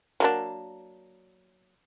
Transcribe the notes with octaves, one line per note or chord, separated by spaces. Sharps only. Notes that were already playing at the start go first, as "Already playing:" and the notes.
F#3 A#3 D4